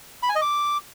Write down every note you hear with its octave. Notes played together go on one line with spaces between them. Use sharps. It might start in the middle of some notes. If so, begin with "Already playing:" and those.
B5
G#5
D#5
D6